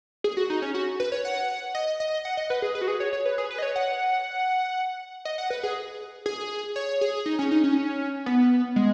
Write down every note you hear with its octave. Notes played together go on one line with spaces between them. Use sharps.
G#4
F#4
D#4
C#4
F#4
B4
C#5
F#5
D#5
D#5
F#5
D#5
B4
G#4
B4
F#4
G#4
C#5
C#5
B4
G#4
B4
D#5
C#5
F#5
D#5
F#5
B4
G#4
G#4
C#5
G#4
D#4
C#4
D#4
C#4
B3
G#3